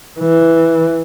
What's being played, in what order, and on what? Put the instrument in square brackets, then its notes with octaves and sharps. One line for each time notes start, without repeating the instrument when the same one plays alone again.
[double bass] E3